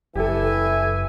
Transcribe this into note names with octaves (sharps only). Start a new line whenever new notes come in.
F#1 G2 E3 G4 A4 E5 G#5